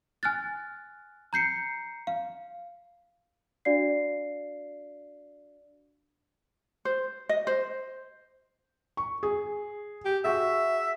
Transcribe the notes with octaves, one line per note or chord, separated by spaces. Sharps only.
G#5 F6 F#6 A6
A#5 G6 C7 C#7
F5
D4 F#4 D5 F5 C7
C5
D#5
C5
C#6
G#4
G4
F#4 G#4 E5